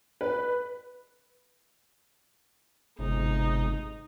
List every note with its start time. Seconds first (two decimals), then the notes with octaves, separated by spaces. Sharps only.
0.21 B4
2.99 G1 G#2 C3 D#4